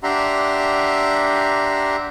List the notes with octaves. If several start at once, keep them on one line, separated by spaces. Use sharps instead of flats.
D4 G4 E5 F#5 A#5 C6